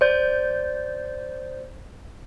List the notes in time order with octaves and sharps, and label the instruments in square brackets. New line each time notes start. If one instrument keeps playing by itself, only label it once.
[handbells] C5 D5 G6